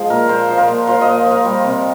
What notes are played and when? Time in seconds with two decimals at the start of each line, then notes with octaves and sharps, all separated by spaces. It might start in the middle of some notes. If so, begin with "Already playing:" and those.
Already playing: F3 G#3 C5
0.10 A#2 A#4
0.28 A#2 C5
0.49 F3
0.58 A#4
0.68 A#2
0.87 F3 F5
1.01 D#5
1.07 A#2
1.26 F3 A#4
1.45 G3
1.65 C3